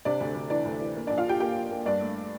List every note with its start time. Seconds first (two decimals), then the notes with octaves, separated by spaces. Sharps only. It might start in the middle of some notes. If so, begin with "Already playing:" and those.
0.05 C3 D4 D5
0.21 D2
0.35 D2
0.50 E3 D4 D5
0.65 D2
0.81 E3
0.95 A#3
1.07 D4 D5
1.10 A#1
1.18 F4 F5
1.26 F3 G4 G5
1.40 A#3 G4 G5
1.56 F3
1.71 A#3
1.86 G2 D4 D5
2.01 A3